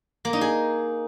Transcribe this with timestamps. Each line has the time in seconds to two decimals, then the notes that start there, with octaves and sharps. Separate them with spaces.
0.25 A#3
0.33 D#4
0.41 G#4